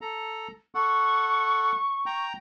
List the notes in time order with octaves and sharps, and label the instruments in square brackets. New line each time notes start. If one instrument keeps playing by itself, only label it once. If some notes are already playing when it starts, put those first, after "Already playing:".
[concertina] A4 A#5
[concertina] A4 F#5 [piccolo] C#6
[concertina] G5 A#5